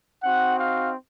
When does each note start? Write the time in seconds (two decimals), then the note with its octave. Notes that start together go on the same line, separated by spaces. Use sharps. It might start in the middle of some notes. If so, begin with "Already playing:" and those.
0.23 C4 D#4 F#4 F#5
0.59 F5